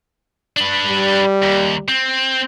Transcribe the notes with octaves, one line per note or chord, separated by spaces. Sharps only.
D4 B4
G3
D#2
C4